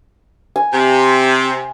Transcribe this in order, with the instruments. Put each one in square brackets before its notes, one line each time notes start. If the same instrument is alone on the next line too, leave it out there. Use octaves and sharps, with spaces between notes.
[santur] G#5
[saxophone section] C3